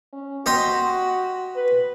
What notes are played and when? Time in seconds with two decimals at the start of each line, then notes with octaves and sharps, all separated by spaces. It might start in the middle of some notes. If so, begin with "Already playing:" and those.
0.13 C#4
0.46 F#4 G4 D#5 C6
1.56 B4